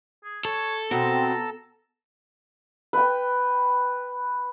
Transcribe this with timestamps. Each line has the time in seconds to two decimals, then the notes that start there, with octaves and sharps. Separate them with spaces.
0.24 G#4
0.45 A4 C#5
0.91 B2 C4 A#5
2.93 B4 G5